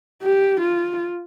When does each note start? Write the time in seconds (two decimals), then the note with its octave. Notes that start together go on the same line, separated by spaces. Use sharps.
0.22 G4
0.60 F4